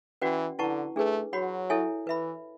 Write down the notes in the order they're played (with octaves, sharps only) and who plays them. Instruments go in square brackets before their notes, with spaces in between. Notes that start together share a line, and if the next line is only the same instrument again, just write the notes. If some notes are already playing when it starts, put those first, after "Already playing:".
[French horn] E3 [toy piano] C#4 F#4 B4 D5 F#5
[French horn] D3 [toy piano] E4 B4 F#5 A5 C#6
[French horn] A3 [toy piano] D4 G#4 B4
[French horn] F#3 [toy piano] F#4 C#5 F#5 B5
[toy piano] E4 A4 C#5 E5 G#5
[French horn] E3 [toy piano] B4 E5 B5